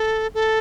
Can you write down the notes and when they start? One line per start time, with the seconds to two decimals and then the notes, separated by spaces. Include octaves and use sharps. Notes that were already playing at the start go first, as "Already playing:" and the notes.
Already playing: A4
0.34 A4